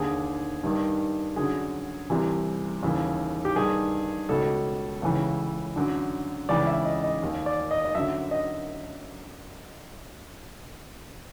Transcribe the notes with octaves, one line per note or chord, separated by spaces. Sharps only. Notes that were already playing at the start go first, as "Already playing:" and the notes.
Already playing: D#2 D3 G#4
G2 D#3
F#2 D3 G#4
C2 C3 E3
D#2 C#3 E3
G4
G2 D#3 G#4
C#2 B2 A4
C#2 C#3 E3
F#2 D3
C#2 C#3 E3 D5
E5
D#5
D#5
D#2 D#3
D5
D#5
D#5
F#2 D3 E5
D#5